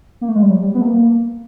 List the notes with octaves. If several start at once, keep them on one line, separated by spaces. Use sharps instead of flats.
A#3
A3
G#3
G3
F#3
G3
B3
A3
A#3